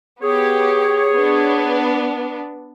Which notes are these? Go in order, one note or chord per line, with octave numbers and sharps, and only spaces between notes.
B3 G4 G#4 C#5
B3 D4